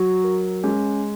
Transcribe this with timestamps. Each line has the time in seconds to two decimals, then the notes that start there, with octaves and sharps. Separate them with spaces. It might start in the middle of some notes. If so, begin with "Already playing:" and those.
Already playing: F#3 F#4
0.24 A#4
0.64 G#3 C#4